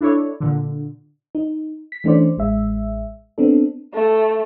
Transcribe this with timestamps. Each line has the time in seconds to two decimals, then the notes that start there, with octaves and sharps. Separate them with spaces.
0.01 D4 E4 A4 C#5 D5
0.40 A#2 D3
1.35 D#4
1.92 B6
2.04 E3 A3 C#4 D4 C5 D5
2.37 A1 G#3 E5
3.38 B3 C4 D4 A4
3.94 A3